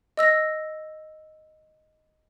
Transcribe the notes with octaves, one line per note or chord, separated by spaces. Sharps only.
D#5 E6 A#6